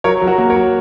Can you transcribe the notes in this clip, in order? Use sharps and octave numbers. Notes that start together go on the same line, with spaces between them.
F#3 A#4 C#5
F#3
F#4 A#4
A#3
A#4 C#5
F#3